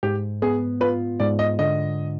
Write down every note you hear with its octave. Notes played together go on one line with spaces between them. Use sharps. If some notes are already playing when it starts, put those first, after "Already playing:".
G#2 G4
B3 G#4
F4 B4
G#2 D5
D#5
D3 D#5